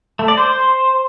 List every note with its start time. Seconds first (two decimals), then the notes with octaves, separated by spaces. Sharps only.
0.19 A3
0.28 D5
0.37 C5